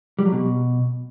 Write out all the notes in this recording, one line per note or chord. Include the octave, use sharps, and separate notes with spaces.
G3
F#3
B2